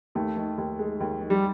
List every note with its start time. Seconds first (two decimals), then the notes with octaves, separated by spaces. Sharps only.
0.15 D#2 A3
0.37 D#3
0.58 D#2
0.79 G#3
1.00 D#2
1.21 D#3
1.30 G3